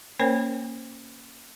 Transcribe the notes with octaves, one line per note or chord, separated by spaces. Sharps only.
A#3 C#4 A#4 C5 C#5 G5